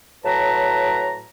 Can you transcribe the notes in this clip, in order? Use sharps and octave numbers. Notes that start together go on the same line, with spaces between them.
A2 F#3 B4 A5 A#5